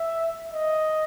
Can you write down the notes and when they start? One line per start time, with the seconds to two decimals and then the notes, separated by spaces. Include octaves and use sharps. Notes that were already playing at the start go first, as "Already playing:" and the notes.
Already playing: E5
0.54 D#5